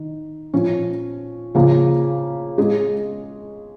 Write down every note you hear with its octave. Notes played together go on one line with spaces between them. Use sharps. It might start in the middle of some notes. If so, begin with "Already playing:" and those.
Already playing: D#3
A#2 F3 C#4
C#3 F3 A#3
G#3 C#4 G#4